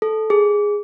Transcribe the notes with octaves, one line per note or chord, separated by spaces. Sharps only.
A4
G#4